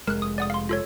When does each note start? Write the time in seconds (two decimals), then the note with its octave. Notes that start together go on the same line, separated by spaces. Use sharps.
0.07 F1 G#3 A#4 F#6
0.22 D#6
0.38 D5 F#5 D#6
0.50 F5 C6
0.69 F4 A4 C#5